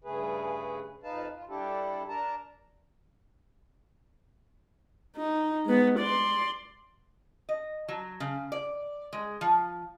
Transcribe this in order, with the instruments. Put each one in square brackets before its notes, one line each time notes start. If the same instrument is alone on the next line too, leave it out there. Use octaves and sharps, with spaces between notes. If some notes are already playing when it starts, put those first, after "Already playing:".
[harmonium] G2 C#3 A3 G#4 B4
F2 D#4 B4 F5 A5
F4
G3 D4 E4 G4 A4
D4 A#4 A5 A#5
[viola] D#4
G#3 B3
D5 C6
[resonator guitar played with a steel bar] D#5
F#3
C#3
D5
G#3
F3